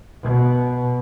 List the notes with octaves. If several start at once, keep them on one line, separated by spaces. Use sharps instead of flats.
B2